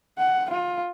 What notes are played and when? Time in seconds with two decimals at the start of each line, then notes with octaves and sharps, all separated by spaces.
0.18 F#5
0.51 F4